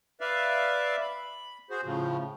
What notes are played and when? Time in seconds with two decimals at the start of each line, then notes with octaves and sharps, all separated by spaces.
0.21 B4 D5 E5 F5
1.01 B5
1.70 F#4 G#4 C5
1.85 A2 C#3 F3